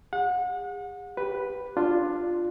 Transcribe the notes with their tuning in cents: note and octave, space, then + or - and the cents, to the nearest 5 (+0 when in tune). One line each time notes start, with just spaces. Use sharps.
G#4 -40 F#5 -35
G4 +0 B4 +0
D4 +15 F4 +0